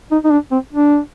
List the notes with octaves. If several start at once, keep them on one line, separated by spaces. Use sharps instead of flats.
D#4
D#4
D4
C4
D4